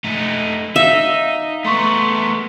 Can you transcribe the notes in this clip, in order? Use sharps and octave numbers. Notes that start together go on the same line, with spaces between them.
A3 D#4
D#4 E5 F5
A3 B3 A#5 C6 C#6